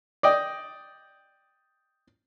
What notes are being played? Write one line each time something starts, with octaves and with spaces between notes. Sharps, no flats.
D5 D#5 G5